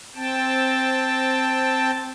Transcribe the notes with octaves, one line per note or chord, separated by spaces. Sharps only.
C4 G5 A5